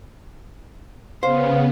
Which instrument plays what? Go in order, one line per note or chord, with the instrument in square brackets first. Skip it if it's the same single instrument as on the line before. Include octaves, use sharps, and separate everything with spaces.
[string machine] C#3 B3 [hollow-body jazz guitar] C5 [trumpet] F5